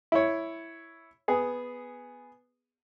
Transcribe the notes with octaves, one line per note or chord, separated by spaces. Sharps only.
E4 C#5
B3 G#4